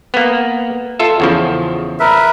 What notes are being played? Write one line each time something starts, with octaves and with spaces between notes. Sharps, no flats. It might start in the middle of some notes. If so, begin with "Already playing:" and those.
A#3 B3
F4 A4 E5
E2 C#3 F3
A#4 B4 E5